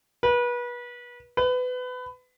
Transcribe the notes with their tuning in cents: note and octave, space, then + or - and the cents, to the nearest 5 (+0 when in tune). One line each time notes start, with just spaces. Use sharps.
B4 -30
B4 +25